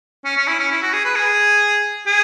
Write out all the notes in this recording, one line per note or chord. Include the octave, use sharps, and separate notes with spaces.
C#4
C#4
E4
C#4
E4
F#4
G#4
B4
G#4
G#4